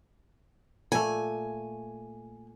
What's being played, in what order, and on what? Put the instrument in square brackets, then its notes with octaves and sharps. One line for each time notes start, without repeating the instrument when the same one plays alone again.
[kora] A#2 A3 [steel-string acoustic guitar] G#5